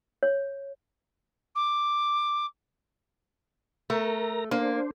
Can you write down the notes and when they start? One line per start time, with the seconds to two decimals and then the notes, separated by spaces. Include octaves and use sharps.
0.23 C#5
1.55 D6
3.90 A3 A#4 A#5
4.51 A#3 D4 C5